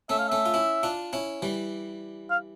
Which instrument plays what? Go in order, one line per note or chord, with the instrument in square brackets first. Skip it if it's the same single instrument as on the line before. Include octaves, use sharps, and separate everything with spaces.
[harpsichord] A3 C#4 [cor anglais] E5
[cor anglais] F5
[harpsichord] A3 C#4 [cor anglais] E5
[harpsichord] F4
C#4 E4
D4 F4
C#4 E4
E3 G3
[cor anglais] F5